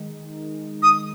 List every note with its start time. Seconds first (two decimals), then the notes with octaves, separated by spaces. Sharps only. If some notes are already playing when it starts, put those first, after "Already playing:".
Already playing: D#3 G#3 D#4
0.83 D#6